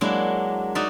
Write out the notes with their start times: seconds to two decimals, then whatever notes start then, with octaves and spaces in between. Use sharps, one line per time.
0.01 F#3 G#3 A#3 D4 E4
0.75 D#4 F#4 D5 E5